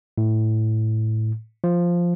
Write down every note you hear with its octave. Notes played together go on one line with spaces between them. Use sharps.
A2
F3